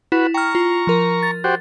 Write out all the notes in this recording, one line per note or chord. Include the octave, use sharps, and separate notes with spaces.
E4 F#4 B4
G5 A#5 C#6 F6
F4
F3 A#4
A6
F#4 G4 C5